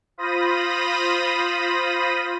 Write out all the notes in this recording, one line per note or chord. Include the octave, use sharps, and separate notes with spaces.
F4 C5 B5 D#6 A#6 D#7